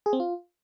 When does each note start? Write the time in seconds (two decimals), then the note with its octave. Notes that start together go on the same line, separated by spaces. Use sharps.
0.06 G#4
0.13 C4
0.20 F4